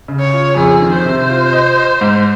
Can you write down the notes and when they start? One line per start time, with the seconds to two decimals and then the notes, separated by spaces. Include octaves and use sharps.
0.08 C#3
0.20 C#5
0.33 F4
0.56 F2 G#4
0.81 D#3
0.93 C5
1.05 C3
1.30 F4
1.53 D#5
1.78 D#5
2.01 G#2